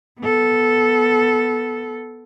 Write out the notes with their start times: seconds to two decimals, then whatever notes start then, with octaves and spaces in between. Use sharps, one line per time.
0.20 B3 A4